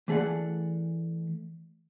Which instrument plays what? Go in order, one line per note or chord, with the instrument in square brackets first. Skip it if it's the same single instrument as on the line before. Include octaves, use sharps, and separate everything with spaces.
[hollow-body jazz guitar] E3 A3 G#4 D5 F#5